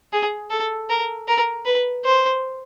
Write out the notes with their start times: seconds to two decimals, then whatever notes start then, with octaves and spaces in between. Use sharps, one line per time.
0.13 G#4
0.50 A4
0.89 A#4
1.28 A#4
1.65 B4
2.05 C5